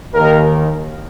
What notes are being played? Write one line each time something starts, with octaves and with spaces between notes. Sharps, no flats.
D#2 D#3 A#4